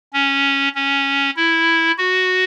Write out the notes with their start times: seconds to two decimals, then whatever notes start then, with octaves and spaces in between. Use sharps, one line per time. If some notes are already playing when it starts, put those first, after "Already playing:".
0.13 C#4
0.75 C#4
1.37 E4
1.98 F#4